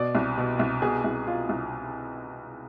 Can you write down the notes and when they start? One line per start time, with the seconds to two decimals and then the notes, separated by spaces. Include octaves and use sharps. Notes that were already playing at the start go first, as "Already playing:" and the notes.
Already playing: B2 D5
0.15 C2
0.38 B2
0.59 C2
0.82 B2 G#4
1.04 C2
1.27 B2 F4
1.49 C2